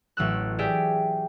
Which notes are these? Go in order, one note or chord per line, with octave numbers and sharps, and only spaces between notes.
A1 F#3 E6 F#6
G4 G#4 D5 E5 G5